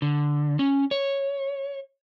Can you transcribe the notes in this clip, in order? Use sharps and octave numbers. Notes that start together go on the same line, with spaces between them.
D3
C#4
C#5